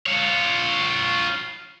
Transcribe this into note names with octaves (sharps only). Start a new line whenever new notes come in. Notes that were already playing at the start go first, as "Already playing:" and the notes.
F4 C#5